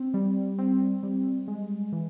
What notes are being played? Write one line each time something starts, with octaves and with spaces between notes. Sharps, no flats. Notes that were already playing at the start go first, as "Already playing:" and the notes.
Already playing: C4
G3
C4
G3
G#3
E3